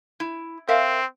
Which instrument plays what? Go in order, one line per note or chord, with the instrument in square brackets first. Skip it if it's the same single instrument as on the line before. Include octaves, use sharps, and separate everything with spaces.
[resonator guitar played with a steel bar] E4
[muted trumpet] C4 [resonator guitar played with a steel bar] A#4 E5 F5